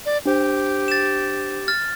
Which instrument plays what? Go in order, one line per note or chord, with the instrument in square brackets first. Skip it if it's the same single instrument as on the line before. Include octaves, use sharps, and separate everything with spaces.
[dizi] D5
[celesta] D4 C5 [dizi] G4
[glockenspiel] A6 E7
F6 A6